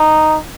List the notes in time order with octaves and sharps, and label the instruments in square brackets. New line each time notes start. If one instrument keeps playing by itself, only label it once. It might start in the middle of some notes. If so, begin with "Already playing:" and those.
Already playing: [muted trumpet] D#4